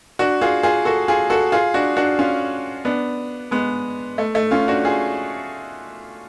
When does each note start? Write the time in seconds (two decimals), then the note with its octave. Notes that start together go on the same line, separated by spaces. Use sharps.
0.19 D4 F#4
0.41 F4 G#4
0.63 F4 G#4
0.85 F#4 A4
1.08 F4 G#4
1.30 F#4 A4
1.52 F4 G#4
1.74 D4 F#4
1.97 D4 F#4
2.19 C#4 F4
2.85 B3 D4
3.51 G#3 B3
4.18 A3
4.35 A3
4.51 C#4 F4
4.68 D4 F#4
4.85 F4 G#4